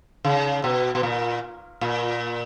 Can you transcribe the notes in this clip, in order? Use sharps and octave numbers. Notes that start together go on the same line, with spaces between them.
C#3
B2
B2
A#2
A#2